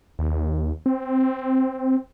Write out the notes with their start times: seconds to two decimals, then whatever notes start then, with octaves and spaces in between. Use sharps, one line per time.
0.19 D#2
0.86 C4